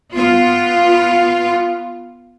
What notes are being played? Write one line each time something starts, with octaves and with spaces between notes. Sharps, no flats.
B3 F4